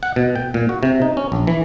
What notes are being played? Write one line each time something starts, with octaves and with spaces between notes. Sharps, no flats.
F#5
B2
G5
A#2
F#4
C3
D#4
C#4
A#1
E3